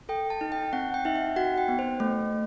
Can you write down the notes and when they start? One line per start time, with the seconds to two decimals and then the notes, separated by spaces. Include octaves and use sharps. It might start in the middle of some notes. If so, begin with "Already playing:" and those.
0.09 A4 G5
0.30 A5
0.41 D#4
0.52 G5
0.73 C4 F#5
0.94 G5
1.05 D#4 E5
1.15 F#5
1.36 F#4 F#5
1.58 G5
1.68 B3
1.79 C5
2.00 A3